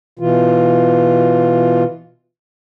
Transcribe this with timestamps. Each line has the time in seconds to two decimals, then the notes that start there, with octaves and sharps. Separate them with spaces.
0.19 B2 E3 F4